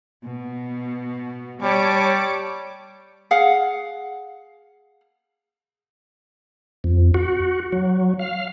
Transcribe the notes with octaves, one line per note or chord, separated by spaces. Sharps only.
B2
G3 C#5 A5 D6
G#4 F5 F#5
F2
F#4
F#3
F5